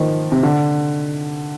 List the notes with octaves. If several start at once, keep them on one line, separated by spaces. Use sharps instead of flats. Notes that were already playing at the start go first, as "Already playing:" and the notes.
Already playing: D#3 F3
C3
D3